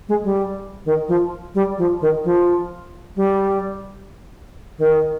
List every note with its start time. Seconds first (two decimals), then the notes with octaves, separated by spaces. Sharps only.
0.08 G#3
0.23 G3
0.85 D#3
1.08 F3
1.54 G3
1.78 F3
2.01 D#3
2.24 F3
3.16 G3
4.78 D#3